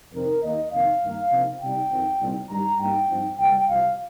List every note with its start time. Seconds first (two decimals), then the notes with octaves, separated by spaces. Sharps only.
0.13 F2 C3 D#3 C4 D#4 A#4
0.42 D#2 D#3 A#3 D#5
0.72 F2 C3 D#3 A#3 D#4 F5
1.02 G2 D#3 A#3
1.31 C3 F3 A#3 D#4
1.61 C3 G3 D#4 G5
1.91 F2 D#3 C4
2.20 C2 A#2 G3 C4 D#4
2.49 G2 D#3 G3 A#5
2.79 G2 G3 A#3 D#4 G5
3.08 G2 F3 C4 D#4
3.38 C2 A#2 G3 G5
3.68 C2 C3 F3 F5